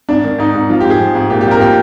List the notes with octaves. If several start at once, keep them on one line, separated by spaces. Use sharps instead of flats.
G#2 D4
D#3
G#2 D#4
G#2
F3 F4
G4
G#2
G#4
F3
G#2
A#2 G4
G4
F3
A#4
A#2 G4